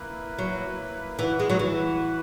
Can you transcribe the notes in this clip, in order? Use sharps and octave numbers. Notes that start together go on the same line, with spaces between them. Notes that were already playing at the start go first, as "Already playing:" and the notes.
Already playing: A#3 E4 B4
F#3
E3 F#4 B4 F#5
G#3
F#3
E3